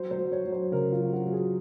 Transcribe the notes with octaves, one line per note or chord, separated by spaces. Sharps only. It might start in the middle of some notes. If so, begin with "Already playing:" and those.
Already playing: F#3 C5
C5
F#3
C#5
F#3
C5
C#3 A#4
F4
F#3
F#4
F#3
G#4